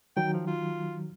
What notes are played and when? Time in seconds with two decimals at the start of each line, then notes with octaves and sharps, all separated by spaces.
0.17 D#3 F#3 G5
0.33 F3
0.47 F4